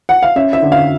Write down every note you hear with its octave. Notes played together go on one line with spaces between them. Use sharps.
F#5
F5
C#4 E5
E5
D3
F5